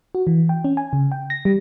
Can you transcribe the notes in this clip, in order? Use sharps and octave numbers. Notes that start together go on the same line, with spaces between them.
F#4
E3
G5
C#4
G#5
C#3
G5
A#6
G3